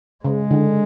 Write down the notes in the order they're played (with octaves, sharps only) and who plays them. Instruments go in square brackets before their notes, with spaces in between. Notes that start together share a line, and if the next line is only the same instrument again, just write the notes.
[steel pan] C#3 [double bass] G#3
[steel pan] D3